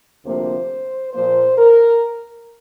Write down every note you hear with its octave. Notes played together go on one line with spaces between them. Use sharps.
D2 C3 F3 A#3 C5
A#2 F3 A#3 C5
A#4